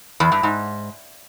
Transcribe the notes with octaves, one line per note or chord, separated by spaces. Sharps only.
E2
G2
G#2